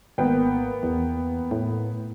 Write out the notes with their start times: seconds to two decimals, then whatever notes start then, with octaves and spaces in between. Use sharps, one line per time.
0.18 G#1 A#3 B3 G5
0.83 E2
1.51 A2